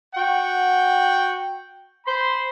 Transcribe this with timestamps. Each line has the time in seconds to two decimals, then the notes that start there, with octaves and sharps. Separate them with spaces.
0.15 F#4 F#5 G5
2.06 C5 B5 C6